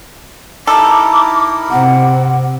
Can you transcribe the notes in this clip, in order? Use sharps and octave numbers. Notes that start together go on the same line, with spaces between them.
D#4 E4 A4 A#4 D6
C3 F#5